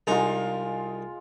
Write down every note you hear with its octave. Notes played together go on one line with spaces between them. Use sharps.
C2 G#3 D#4 F4